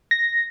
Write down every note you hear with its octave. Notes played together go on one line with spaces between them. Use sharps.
A#6